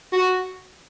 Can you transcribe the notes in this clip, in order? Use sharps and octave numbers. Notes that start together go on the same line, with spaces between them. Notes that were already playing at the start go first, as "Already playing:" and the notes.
F#4